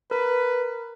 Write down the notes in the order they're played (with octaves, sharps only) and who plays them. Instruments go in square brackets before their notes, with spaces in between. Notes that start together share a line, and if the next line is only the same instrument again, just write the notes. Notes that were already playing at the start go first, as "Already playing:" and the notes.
[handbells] A#4 [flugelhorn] B4